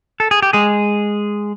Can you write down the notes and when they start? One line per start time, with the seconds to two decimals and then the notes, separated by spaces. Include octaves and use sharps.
0.20 A4
0.31 G#4
0.43 G4
0.53 G#3 G#4